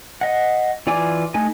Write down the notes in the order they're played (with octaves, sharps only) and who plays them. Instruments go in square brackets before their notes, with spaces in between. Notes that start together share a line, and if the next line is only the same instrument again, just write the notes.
[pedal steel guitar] D#5 F#5
E3 F4 D5 G#5 D6
A3 D#4 G#5